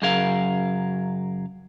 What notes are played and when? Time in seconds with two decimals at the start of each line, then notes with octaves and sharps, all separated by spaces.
0.02 F#2 C#3 F#3 G#4 A#4 F5